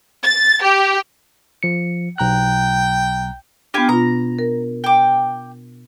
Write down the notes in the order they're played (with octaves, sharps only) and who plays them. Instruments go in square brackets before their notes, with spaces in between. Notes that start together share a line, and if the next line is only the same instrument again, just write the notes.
[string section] A6
G4
[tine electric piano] F3 C#7
[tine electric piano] B1 A#5 F#6 [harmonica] G5
[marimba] B3 D4 [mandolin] F4 G4 G#5
[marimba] B2 F4 [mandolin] A#5
[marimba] A#4
[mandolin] G5 D6